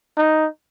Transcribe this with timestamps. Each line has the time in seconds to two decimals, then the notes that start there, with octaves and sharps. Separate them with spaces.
0.18 D#4